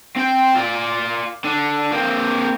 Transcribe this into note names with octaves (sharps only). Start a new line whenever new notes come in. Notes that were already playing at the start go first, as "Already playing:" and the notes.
C4 G5
F4 D5
D3 D4
A#3 C4